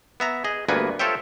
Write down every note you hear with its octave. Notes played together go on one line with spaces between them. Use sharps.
B3 E5 A#5
G#4 D#5
D2 G2 A#3 B3 B4 G#5
F4 A4 C5 C#5 E5 G5